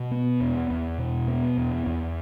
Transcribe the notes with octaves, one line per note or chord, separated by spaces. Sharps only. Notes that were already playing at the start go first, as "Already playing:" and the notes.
Already playing: B2
B3
E2
E2
B2
B3
E2
E2